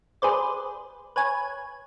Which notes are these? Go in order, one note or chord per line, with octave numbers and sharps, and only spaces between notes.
G#4 B4 C5 D5
B4 C#5 G#5